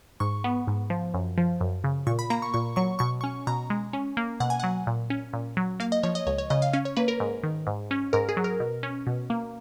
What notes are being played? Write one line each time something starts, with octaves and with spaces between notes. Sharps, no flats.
G#2 C#6
B3
G#2
F3
F#2
F3
F#2
C#3
A#2 C#6
B5
A#3 A#5
C#6
A#2 C#6
F#3 C#6
B2 C#6
C#4 C#6
B2 A#5
G#3
C#4
A#3
B2 F#5
G#5
F#3 F#5
A#2
C#4
A#2
F#3
A#3 F5
D#5
F3 C#5
D#5
C#2 C#5
C#5
C#3 D#5
F5
C#4 F5
C#5
A#3 B4
A#4
G#2
D#3
G#2
C#4
G#2 A#4
G#4
F#3
A#4
B2
C#4
B2
A#3